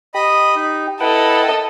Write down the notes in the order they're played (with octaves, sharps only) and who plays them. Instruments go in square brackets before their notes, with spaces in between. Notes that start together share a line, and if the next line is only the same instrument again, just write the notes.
[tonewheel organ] G4 [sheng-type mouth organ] D#5 B5 D#6
[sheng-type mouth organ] D#4
[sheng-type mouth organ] E4 [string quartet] A4 D#5 [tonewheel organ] B4 F#5 G5